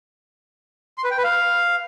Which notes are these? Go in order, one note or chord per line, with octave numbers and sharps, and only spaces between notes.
C6
B4
G5
B4
F5